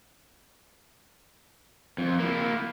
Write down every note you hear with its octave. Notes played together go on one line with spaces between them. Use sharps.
F2
A#3 E4